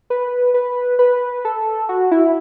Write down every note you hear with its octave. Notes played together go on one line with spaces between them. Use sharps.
B4
B4
B4
A4
F#4
E4